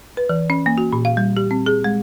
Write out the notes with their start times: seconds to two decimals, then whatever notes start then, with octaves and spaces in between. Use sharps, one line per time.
0.17 B4
0.29 E3
0.50 C#4
0.66 A#3
0.78 F#4
0.93 A#2
1.05 F5
1.17 G3
1.37 G4
1.51 C4
1.66 G#4
1.84 G#3